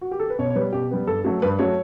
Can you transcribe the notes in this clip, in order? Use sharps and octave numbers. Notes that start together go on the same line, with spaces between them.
F#4
G4
A4
B4
B2 C#5
C#5
G3 B3 B4
B2 G4
G3 B3
G2 A4
F#3 A3
G2 B4
F#3 A3 C#5